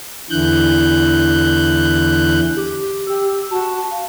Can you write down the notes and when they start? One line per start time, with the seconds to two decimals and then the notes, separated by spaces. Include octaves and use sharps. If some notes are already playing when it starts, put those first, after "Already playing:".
0.30 E2 D3 E3 F#6 G6
2.56 G4
3.07 G4 E6
3.51 F#4 A5
3.91 F5